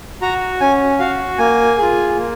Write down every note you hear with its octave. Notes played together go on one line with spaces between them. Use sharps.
F#4 A#5
C#4 G#5
F#4 F5
A#3 G#5
F4 G#4
A#3